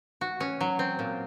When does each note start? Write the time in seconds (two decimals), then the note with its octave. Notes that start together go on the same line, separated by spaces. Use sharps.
0.21 F#4
0.40 C#4
0.61 F#3
0.79 C4
0.99 A#2